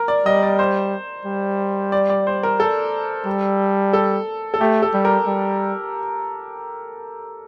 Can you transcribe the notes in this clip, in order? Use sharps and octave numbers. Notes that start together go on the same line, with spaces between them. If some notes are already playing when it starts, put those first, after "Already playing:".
Already playing: A#4
D5
G3 D#5
D5
C5
G3
D5
D5
C5
A#4
A4
G3
A4
A4
A3 G4
A4
G3
A#4
G3